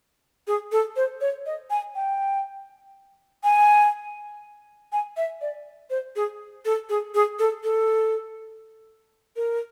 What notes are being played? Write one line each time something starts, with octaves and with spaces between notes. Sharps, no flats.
G#4
A4
C5
C#5
D#5
G#5
G5
G#5
G#5
E5
D5
C5
G#4
A4
G#4
G#4
A4
A4
A#4